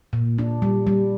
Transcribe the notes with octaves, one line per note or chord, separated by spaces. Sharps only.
A#2
D4
G3
G3